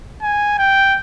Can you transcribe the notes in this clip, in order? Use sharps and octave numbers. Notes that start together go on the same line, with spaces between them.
G#5
G5